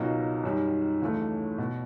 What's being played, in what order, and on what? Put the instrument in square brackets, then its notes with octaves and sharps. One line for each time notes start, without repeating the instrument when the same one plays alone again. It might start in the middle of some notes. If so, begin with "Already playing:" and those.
Already playing: [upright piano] C#2 B2 F#3 A#3 D#4
F#2 D#3 G3
D#2 C#3 E3 A3
B2